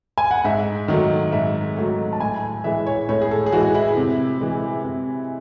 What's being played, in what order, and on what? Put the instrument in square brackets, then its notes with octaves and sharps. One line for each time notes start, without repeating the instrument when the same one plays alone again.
[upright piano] G#5
F#5
G#2 E5
D#3 F#3 A3
G#2 E5
D#3 F#3 A3
A5
A2 G#5
G#5
E3 G#3 E5
C#5
A2 C#5
G#4
A4
G#4
E3 G#3 F#4
E4
C3
E3 G#3
C3